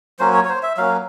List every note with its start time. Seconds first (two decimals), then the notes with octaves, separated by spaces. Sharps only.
0.19 F#3 A#3 C#4 C5
0.34 C#5
0.45 C#5
0.49 C5
0.63 E5
0.77 F#3 A#3 C#4 F5